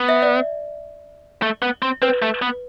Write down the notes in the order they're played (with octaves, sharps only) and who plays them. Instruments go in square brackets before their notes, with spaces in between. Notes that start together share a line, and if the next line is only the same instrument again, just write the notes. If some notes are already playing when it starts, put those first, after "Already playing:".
Already playing: [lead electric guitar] B3
[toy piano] E5
D5
[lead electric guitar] A3
B3
C4
[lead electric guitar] C4 [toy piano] B4
[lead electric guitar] A3
B3